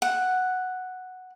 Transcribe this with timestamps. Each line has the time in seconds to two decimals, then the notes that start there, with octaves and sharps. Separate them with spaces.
0.02 F#5